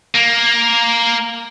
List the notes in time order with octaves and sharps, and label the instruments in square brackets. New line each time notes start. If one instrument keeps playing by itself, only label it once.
[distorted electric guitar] A#3